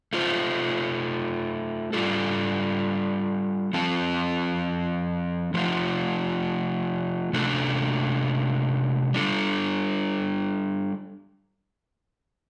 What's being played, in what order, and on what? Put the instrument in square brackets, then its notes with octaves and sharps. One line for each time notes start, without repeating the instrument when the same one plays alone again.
[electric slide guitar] A3 F4 C5
G3 F4 A4
F3 C4 A4
F3 A3 F4
C3 A3 D4 A4
G3 D4 A4